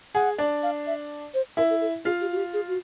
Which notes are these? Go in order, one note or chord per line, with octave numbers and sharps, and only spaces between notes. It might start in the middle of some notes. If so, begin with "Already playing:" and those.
G#4 F#5
D4 D5
F5
E5
C5
E4 A#4 E5
A4
A4
F4 G#4 F5
G4
F#4
G4
G#4
F#4